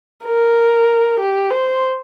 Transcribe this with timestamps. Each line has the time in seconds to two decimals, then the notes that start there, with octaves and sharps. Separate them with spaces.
0.25 A#4
1.20 G4
1.50 C5